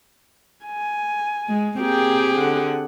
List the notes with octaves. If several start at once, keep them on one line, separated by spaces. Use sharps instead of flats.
G#5
G#3
A#3 C4 G4 G#4 G5
D3 F#5